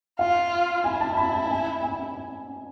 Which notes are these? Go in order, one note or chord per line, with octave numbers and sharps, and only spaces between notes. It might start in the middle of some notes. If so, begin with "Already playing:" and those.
F4 F5
E4 G#5
A5
B5
A5
G#5
G#5